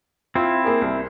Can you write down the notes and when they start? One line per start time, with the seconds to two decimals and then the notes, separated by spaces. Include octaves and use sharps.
0.35 C4 E4 F4
0.64 A#3 G#4 A#4
0.82 C2